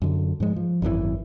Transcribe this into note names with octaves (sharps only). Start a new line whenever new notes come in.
F#2 D3
G#2 F3 G#3
F3
G#1 F#2 A2 E3